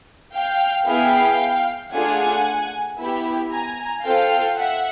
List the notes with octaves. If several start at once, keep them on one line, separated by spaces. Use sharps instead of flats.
F5 G5
B3 E4 G#4 F5 G5
A3 D4 F4 G#4 F#5 G#5
B3 E4 G4
G#5 A#5
C4 F4 A4 F5 G5
E5 F#5